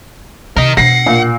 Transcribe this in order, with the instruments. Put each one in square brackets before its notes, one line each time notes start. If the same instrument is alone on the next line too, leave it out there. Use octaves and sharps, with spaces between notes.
[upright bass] C3 [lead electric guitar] A#4 D#5
[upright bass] B2 D4 [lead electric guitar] F#5 [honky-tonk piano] A#6 C7
[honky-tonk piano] A#2